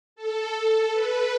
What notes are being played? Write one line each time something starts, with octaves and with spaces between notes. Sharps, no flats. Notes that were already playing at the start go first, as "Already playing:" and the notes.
A4
B4